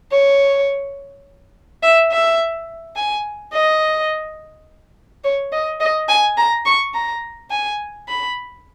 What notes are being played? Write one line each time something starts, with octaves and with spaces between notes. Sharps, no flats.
C#5
E5
E5
G#5
D#5
C#5
D#5
D#5
G#5
A#5
C#6
A#5
G#5
B5